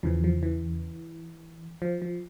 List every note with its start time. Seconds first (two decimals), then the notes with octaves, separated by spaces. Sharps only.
0.03 E2 C#3 E3 F3
0.24 F3
0.43 E3
1.82 F3
2.02 F3